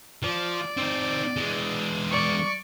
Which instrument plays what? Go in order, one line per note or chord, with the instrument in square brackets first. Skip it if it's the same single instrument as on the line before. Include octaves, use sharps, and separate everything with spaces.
[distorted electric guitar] F3 [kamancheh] D5
[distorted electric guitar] C4 D#4
E3 G#3
[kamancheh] D5 C#6